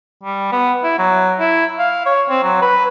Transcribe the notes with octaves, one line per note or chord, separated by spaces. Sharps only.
G3
B3
E4
F#3
E4
F5
C#5
C4
F#3
B4